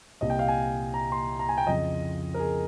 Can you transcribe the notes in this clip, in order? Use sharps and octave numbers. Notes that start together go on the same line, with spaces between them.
C2 A#2 G3 D#5
G5
F5
G#5
A#5
C6
A#5
G#5
G5
F2 C#3 F3 D#5
A#4
G#4